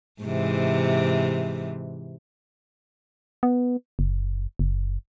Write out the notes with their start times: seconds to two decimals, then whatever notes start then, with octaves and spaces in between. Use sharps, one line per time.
0.22 G#2 C3 E3
3.43 B3
3.99 F#1
4.59 F#1